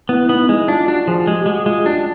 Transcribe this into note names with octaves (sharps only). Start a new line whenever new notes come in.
B3 E4
E4
B3 D#4
D#4
G#3 E4
D4 F4
D4 F#4
F3 G#4
G#3 G4
G4
G#3 F#4
G#3 F4
D4 G4